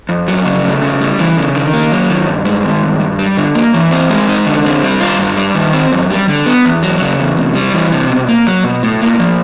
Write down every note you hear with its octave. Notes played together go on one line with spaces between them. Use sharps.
F2
F#3
C#3
A3
C#3
G3
E3
C#3
D#3
A#3
F#3
D#3
G2
G#3
D#3
G2
G2
G3
D3
A#3
E3
C4
G#3
D#4
D3
C4
G3
F4
G2
G3
D#3
C4
F#2
G3
D3
B3
E2
F#3
C#3
E2
C3
G3
E3
C3
B2
A#3
F#3
B2
A2
A#3
F3